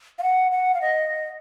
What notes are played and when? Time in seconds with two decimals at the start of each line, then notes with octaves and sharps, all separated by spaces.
0.18 F5
0.23 F#5
0.51 F#5
0.74 F5
0.81 D#5